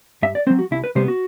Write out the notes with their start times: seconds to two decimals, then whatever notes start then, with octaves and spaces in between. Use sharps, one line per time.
0.22 G2 E5
0.35 D5
0.47 C4 C5
0.50 F#3
0.59 F#4
0.71 C2 E4
0.84 B4
0.95 C3 G3 B3 C5
1.08 F#4